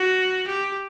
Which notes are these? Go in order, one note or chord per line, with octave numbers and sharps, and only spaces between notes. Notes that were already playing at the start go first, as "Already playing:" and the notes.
Already playing: F#4
G4